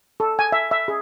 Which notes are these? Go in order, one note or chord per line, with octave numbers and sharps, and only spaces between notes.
A4
G#5
E5
E5
G#4